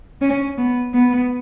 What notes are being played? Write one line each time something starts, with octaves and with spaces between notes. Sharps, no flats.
C#4
B3
B3